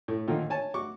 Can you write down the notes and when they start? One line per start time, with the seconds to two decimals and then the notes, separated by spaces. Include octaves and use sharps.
0.08 A2 A3
0.27 A#2 D3 D#3 F3 A#3
0.50 C#5 G#5 A5
0.74 F#4 C#6 D6